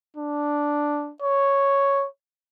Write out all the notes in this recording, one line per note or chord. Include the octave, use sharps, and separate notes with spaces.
D4
C#5